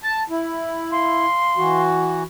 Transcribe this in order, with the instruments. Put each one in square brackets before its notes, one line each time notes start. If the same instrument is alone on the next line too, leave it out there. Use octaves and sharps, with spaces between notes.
[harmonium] A5
E4
[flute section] F5 C6
[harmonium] E3 F#4